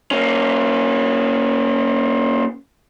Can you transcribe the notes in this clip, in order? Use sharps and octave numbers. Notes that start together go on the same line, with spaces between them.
A#3 C#4